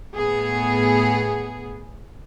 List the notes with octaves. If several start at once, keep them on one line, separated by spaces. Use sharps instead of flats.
A2 B3 G#4